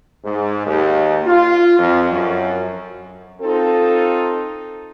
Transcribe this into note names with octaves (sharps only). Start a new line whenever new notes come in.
G#2
D#2
F4
F2
F#2
C4 D#4 F4 A4